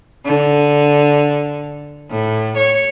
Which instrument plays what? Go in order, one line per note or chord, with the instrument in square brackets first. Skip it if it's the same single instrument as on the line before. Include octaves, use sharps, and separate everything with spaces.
[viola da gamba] D3
A2
C#5